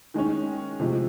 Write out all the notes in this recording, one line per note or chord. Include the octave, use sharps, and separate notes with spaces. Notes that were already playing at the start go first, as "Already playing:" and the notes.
D#3 G#3 C#4
C3 F3 G#3